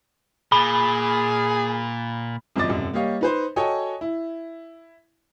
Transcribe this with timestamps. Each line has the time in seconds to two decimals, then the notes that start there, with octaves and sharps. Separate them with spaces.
0.52 A#2 G#4 B5
2.56 G#1 F#2 F3 D#5 D6 A6
2.69 E1 F#2 C3
2.93 G3 A#3 G4 C#5 D#5 F5
3.21 D#4 B4 C5
3.56 F#4 A4 C#5 D#5 G5 G#5
4.01 E4